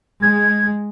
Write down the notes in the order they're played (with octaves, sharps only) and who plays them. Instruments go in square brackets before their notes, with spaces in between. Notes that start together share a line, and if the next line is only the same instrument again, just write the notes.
[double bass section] G#3 [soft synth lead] G#6